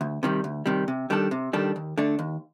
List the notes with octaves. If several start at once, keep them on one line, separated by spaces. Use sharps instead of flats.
D2
C3 D#3 G3
D2
C3 D#3 G3
C3
D#3 G3 D4 A4
C3
D#3 G3 D4 A4
D#2
D3 A3 D4
D#2